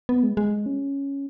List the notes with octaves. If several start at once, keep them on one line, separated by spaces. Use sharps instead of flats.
B3
G#3
G#3
C#4